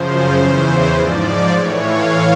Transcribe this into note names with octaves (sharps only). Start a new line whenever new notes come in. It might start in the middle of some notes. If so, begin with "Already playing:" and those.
Already playing: F#2 C#3 F3 C5
E2 C#3 E3
G#2 F3 D5
A2 E3 C#5
F5